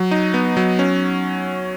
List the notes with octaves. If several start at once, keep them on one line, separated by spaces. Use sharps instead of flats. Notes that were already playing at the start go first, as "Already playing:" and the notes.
Already playing: F#3
D#4
B3
F#3
C#4